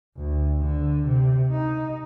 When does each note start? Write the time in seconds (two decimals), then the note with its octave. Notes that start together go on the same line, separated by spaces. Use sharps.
0.16 D2
0.61 D3
1.06 C3
1.51 D#4